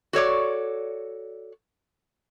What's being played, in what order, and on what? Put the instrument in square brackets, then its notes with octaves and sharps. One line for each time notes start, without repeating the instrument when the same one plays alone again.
[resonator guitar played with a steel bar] F#4 A4 C#5 D5